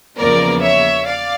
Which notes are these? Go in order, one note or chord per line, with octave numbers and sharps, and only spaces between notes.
E2 C#3 F3 A#3 A#4 D5
C#5 E5
D5 F5